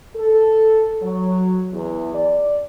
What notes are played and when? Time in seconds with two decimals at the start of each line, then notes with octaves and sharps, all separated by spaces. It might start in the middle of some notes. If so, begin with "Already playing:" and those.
0.15 A4
1.02 F#3
1.72 E2
2.15 D5